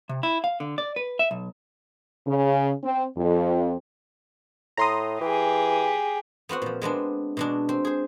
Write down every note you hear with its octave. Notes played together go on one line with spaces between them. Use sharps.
C3
E4
F5
D3
D5
B4
E5
B1
C#3
C4
F2
A2 A#5 C6 D#6
E3 G4 G#4
B3 C4 F#4 F#5
A#2 F3
G#3 B3 C4 D4
B2 G#3 D4
C4
G#4 C5